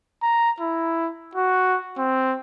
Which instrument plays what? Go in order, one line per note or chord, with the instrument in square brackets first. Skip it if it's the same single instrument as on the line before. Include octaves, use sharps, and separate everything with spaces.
[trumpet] A#5
E4
F#4
C4